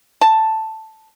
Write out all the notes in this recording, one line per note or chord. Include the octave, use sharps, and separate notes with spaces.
A5